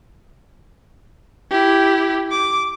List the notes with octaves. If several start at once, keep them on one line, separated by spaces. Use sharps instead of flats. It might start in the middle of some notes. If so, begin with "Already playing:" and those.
E4 G4
D6